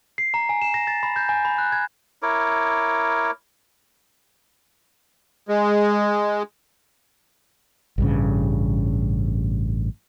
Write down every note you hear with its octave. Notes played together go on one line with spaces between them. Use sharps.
C7
A#5
G#5
E7
A#6
A6
B5
G6
G#5
B5
F#6
G#6
E4 A#4 C#5 D6
G#3
A1 G2 C#3